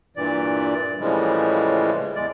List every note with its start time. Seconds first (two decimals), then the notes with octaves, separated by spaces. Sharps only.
0.16 G2 A#2 E3 D5
1.00 A2 C#3 E3 F3 G3 G#3
2.16 E2 G#3 D5